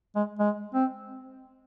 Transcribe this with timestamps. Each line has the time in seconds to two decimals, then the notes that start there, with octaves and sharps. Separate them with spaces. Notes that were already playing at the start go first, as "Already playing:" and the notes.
0.16 G#3
0.39 G#3
0.74 C4